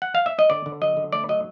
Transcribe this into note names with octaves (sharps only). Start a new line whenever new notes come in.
F#5
F5
E5
D#5
D3 D5
D3
F#3 D#5
D3
A3 D5
F#3 D#5